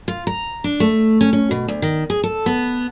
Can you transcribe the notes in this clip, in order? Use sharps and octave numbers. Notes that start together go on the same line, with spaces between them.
F4
A#5
D4
A3
C#4
C#4
B2
D2
D#3
G#4
A4
B3